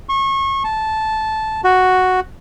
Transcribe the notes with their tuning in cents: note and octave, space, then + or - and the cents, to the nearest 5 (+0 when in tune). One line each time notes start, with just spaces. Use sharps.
C#6 -30
A5 -10
F#4 +0